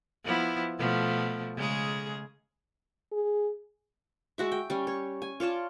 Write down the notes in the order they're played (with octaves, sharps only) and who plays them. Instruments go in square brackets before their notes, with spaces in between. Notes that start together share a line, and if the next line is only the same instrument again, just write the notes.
[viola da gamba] F3 B3 E4
B2 F3 A3
C#3 G#3 G#4
[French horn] G#4
[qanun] G#3 F#4 E5
G5
G3 C#4
C#5
G#5
F4 C#5 D5 A5